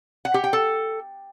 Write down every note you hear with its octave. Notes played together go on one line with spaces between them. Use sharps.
F#5
G4
G5
A4